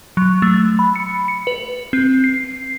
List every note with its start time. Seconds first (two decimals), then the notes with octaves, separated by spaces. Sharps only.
0.17 F#3
0.42 A3
0.79 B5
0.96 C#7
1.28 C#7
1.47 B4
1.93 C4
2.24 C7